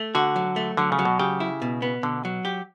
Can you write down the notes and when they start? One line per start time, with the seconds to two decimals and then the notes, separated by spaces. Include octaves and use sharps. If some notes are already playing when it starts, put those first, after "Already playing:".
Already playing: A3
0.15 D3 F#4
0.36 F#3
0.56 A3
0.77 D3 F#3
0.92 C#3
0.99 F#3
1.05 B2
1.19 C#3 G4
1.40 E4
1.62 B2
1.82 B3
2.03 B2 D3
2.25 F#3
2.45 G4